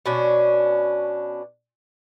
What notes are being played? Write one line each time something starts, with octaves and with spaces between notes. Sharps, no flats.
B2 C#4 D4